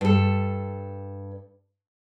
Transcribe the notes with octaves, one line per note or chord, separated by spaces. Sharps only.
G2 A4